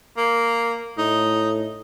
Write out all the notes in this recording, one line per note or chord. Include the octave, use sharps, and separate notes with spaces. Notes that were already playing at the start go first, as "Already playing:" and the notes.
A#3
A2 D#4